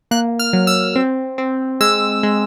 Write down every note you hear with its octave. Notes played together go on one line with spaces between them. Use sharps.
A#3 F#6
F6
F#3
E6
C4
C4
G#3 E6
G#3